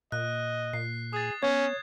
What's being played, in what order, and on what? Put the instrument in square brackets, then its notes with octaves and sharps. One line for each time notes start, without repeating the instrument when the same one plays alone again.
[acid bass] A#2 [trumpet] D#5 [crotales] F#6
[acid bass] A#2 [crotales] C7
[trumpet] G#4 [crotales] D#6 A6
[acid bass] B3 [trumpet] C#4 [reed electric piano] C#5 [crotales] G#6